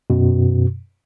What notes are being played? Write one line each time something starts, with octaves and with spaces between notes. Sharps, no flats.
F#2 B2